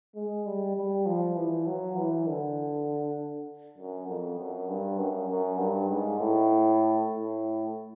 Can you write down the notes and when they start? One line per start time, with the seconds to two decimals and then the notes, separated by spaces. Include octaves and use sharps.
0.16 G#3
0.46 G3
0.76 G3
1.06 F3
1.36 E3
1.66 F#3
1.97 E3
2.27 D3
3.78 F#2
4.08 F2
4.39 F#2
4.68 G2
4.98 F#2
5.29 F#2
5.59 G2
5.89 G#2
6.20 A2
7.10 A2